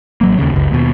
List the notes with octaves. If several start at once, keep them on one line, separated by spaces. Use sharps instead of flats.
A1 F#3 A#3
D#2 C#3
F#1 C#2
D#2 B2